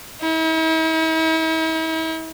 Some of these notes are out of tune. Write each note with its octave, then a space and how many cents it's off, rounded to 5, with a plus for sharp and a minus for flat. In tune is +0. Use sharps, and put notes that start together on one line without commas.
E4 -45